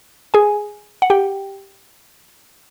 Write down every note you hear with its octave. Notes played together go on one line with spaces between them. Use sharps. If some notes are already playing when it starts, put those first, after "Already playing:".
G#4 G#5
F#5
G4 G5